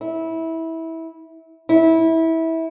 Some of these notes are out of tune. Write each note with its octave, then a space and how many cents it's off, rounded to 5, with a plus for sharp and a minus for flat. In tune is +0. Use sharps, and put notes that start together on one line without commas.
E4 -20
E4 -20